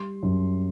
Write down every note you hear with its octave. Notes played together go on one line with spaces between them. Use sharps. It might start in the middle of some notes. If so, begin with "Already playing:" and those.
Already playing: G3 C6
F#2